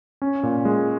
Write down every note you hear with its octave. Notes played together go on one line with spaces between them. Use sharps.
C#4
A#2
G#3